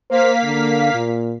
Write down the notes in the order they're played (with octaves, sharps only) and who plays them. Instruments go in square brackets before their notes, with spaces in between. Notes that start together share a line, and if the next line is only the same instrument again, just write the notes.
[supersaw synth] A#3 F5 B6 [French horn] C5
[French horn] D3
A#2